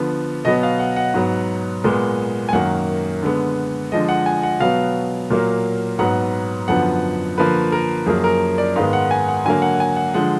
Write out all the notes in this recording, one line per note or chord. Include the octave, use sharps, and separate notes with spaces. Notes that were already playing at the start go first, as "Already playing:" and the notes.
Already playing: D3 F3 B3
B2 F#3 B3 D#5
F5
F#5
F#5
G#2 F#3 B3
A#2 G#3 B3
G#5
F#2 D#3 A#3 F#5
D3 G#3 B3
D3 F3 G#3 D#5
F#5
G#5
F#5
B2 F#3 B3 F5
A#2 F#3 A#3
G#2 F#3 B3 F#5
F#2 D3 F3 B3 F#5
D3 F3 A#3 B4
A#4
F#2 F3 A#3 G#4
A#4
D5
G#2 D#3 G#3 B3 F5
F#5
G#5
F#5
D3 F#3 A#3 G#5
F#5
G#5
F#5
D3 F3 G#3 F#5